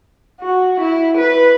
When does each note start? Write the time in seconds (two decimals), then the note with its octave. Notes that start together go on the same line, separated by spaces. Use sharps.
0.40 F#4
0.80 E4
1.17 B4